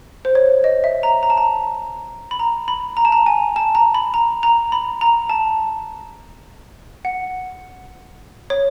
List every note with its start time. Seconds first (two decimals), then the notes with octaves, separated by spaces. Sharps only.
0.25 C5
0.35 C#5
0.64 D#5
0.84 E5
1.03 A#5
1.23 A#5
1.30 A5
1.37 A#5
2.31 B5
2.39 A#5
2.68 B5
2.97 A#5
3.05 A5
3.12 A#5
3.26 G#5
3.56 A5
3.75 A#5
3.95 B5
4.14 A#5
4.43 A#5
4.72 B5
5.01 A#5
5.30 A5
7.05 F#5
8.50 C#5